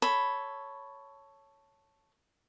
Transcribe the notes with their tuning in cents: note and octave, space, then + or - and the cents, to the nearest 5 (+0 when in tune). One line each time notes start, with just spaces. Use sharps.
A4 +0 C#5 +0 B5 +0